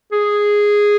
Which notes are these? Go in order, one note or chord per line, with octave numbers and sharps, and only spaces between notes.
G#4